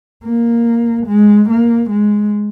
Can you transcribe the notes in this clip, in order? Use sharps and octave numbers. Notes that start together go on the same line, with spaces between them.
A#3
G#3
A#3
G#3